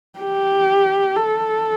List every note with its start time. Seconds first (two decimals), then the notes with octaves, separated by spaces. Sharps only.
0.19 G4
1.16 A4